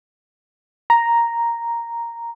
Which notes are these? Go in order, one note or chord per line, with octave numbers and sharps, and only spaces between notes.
A#5